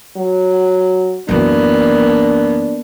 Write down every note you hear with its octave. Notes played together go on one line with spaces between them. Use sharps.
F#3
F#2 E3 A#3 B3 D4